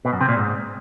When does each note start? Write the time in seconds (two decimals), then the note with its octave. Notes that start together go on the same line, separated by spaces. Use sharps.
0.05 B2
0.13 F#2
0.21 C3
0.29 A#2
0.37 G#2